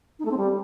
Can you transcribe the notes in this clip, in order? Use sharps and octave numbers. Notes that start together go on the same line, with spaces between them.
D#4
A3
C4
G3